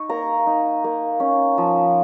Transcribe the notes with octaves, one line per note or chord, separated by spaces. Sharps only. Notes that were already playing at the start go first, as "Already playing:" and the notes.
Already playing: D#4 C#6
A#3 A#5
D#4
A#3
C#4
F3